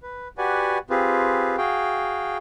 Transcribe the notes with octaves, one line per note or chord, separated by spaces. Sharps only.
B4
F#4 G4 B4 D5 F#5 G#5
C4 F4 G4 G#4 B4
F#4 G#4 F5 G5